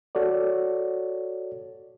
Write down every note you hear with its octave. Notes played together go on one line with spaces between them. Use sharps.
F#4 A4 C#5 D5